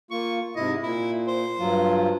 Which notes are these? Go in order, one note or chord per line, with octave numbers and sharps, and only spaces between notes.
A#3 F4 C#6
G#2 C3 E4 D#5
A#2 E4
C5
G2 F#3 F4